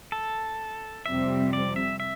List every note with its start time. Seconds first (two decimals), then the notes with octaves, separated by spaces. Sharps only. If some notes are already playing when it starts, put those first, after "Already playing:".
0.12 A4
1.06 F2 C3 G3 C4 E5
1.53 D5
1.76 E5
2.00 E5